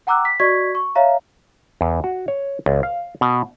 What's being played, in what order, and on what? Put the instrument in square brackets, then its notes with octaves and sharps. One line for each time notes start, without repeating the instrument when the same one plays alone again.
[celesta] F#5 G5 A#5 D6 E6 F#6
B6
F#4 D5 D#5 C#6 G#6 B6
C#6
C#5 E5 F5 A#5
[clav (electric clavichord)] E2
F#4
C#5
C#2
F5
B2